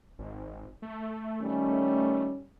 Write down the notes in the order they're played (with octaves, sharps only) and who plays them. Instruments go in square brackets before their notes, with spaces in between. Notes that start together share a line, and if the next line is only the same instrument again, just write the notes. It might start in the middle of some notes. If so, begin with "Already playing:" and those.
[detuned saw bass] G#1
A3
[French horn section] D#3 G3 C#4